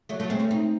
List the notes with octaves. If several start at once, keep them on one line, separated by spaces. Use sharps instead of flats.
F#3 A3
F#3 A3
G#3 C4
A3 C#4
C4 D#4